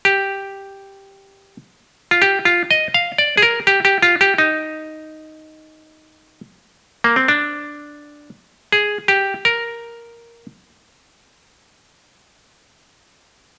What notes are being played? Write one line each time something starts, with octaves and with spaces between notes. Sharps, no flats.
G4
F4
G4
F4
D#5
F5
D5
G#4
A#4
G4
G4
F4
G4
D#4
A#3
C4
D4
G#4
G4
A#4